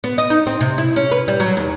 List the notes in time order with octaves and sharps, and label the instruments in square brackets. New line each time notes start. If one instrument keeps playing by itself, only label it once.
[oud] B3
D#5
D#4
C4
C3
E4
C#4
B4
G3
F#3
D#2